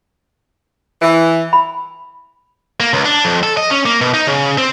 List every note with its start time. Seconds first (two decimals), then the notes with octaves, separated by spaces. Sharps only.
1.02 E3
1.53 B5
2.80 A#3
2.93 C#2
3.05 D4
3.25 F2
3.43 A4
3.57 D#5
3.71 C#4
3.86 A#3
4.01 B2
4.14 D#4
4.27 C#3
4.58 C4